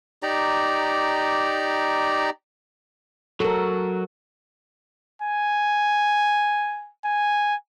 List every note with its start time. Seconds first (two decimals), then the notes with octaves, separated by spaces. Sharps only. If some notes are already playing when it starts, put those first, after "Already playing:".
0.23 D#4 G4 D5 A#5
3.40 F#3 F#4 A4 A#4
5.22 G#5
7.05 G#5